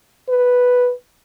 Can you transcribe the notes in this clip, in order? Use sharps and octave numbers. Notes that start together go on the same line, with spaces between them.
B4